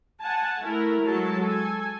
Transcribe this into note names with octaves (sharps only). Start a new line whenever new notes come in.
F#5 G#5 A5
A3 E4 A#4
F#3 G#3 A4 A5
A4 G#5